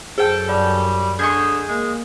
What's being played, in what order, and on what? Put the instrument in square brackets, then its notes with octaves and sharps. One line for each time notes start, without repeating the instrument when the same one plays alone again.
[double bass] F#2 [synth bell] G#4 [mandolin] A4 G5
[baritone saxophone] G3 [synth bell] D5
[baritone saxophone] D3 [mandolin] G#4 D#5 C#6 [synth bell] G6
[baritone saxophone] G#3 [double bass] A#3